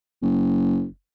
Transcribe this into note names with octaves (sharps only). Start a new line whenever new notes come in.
F#1